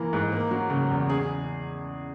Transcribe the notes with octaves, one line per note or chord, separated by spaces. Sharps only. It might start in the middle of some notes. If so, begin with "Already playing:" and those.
Already playing: E3 A#3
G#2
A#3
F#3
C#3
E2
G#4